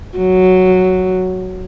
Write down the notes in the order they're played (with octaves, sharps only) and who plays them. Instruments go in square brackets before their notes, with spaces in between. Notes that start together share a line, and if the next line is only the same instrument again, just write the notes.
[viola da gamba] F#3